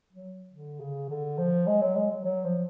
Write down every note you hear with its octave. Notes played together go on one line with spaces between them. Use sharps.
F#3
D3
C#3
D3
F3
G#3
F#3
G#3
F#3
F#3
F3